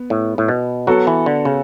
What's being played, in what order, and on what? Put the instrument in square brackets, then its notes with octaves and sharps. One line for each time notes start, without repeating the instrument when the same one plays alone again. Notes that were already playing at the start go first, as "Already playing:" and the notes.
Already playing: [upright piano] B3
[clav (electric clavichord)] A2
A2
B2
[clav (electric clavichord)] F#3 [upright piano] B3 F#4 A4
[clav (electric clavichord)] E3
D3
C#3